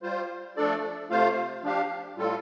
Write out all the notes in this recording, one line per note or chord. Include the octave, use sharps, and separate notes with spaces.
G3 F4 C5
F3 A3 D4 A4 D5
C3 A3 F4 C5 F5
F3 D4 G4 F5
A2 G3 F4 A4